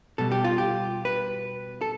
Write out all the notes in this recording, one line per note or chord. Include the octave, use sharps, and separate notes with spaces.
B2 G3 A4
G4
F4
G4
B4
A4